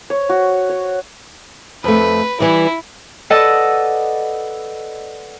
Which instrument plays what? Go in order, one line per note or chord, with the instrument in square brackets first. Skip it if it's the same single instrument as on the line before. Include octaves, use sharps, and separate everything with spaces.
[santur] C#5
F#4
C#5
[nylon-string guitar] F2 A3 [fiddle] B4
[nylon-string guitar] E3 G3 [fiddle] E4
[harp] A4 B4 D5 D#5 F#5 A5